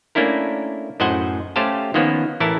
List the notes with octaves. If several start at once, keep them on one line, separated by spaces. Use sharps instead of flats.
A3 A#3 C#4 D4 E4 A#4
F#2 A2 C5 D#5 F#5 G#5
A3 C#4 G4 C5 F5 A5
D#3 F3 A#3 B3 C#4
A1 E3 E4 A#4 A5